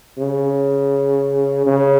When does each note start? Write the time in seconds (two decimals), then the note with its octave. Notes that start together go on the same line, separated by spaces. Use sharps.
0.18 C#3
1.66 C#3